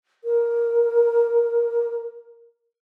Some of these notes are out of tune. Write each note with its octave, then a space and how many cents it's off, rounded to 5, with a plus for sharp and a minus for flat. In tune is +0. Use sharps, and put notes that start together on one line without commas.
A#4 +10